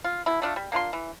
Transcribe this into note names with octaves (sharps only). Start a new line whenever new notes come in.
F4
B2 E4
A3 D4 F4
G3
A#3 D4 F4 C6
E3